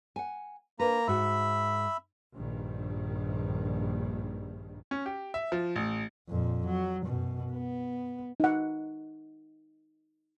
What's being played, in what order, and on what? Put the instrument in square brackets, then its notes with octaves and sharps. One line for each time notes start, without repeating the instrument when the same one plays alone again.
[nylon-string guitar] F#5 G#5
[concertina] A#3 A#5 [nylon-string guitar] D4 B4
[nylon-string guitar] G#2 F#4 [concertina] E5 B5
[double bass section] A#1 G2 D#3
[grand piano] C#4
G4
E5
F3
A1
[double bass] F2 A#2
F#3
F#2 B2
B3
[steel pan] D#4 F#5